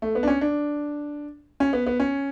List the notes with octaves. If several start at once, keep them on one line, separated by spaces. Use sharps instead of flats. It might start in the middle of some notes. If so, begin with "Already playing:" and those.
A3
B3
D4
C#4
D4
C#4
B3
B3
C#4